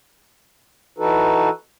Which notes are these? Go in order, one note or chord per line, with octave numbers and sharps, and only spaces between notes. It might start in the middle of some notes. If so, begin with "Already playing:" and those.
E3 D#4 F#4 A4 B4